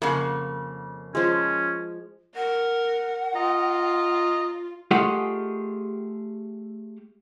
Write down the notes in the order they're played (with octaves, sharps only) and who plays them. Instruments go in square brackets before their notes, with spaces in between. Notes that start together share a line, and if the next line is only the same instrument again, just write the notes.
[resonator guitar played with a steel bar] F2 C#3 [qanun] A#3 F#5
[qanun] F3 G#3 [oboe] C#4
[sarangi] A#4 [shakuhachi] F#5
[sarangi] F4 [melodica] D#5 A#5
[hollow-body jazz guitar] A3 F4 G4 G#4 D#5 F#5